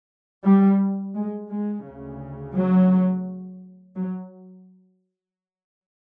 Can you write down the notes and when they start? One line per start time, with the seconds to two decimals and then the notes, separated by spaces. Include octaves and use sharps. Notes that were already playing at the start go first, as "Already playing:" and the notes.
0.44 G3
1.15 G#3
1.49 G#3
1.85 D2 C#3
2.55 F#3
3.96 F#3